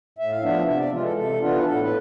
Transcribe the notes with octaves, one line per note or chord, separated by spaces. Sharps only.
A2 E5
F5
F3 B3 D4 E5
C3 E5
D5
E3 G#3 F4
A4
C3 A4
E3 B3 D4 F4
B4
A2 A4
B4